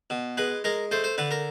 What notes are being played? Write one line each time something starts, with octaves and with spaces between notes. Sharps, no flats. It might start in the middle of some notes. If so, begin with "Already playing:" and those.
B2
G#3 B4
G#3 A#4
A3 C5
C5
D3 B4
A#4